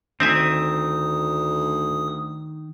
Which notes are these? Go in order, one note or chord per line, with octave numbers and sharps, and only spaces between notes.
D2 D#3 C4 E5 G#5 D#6